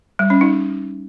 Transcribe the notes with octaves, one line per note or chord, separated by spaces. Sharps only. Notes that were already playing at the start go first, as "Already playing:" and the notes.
G3
C#4
D#4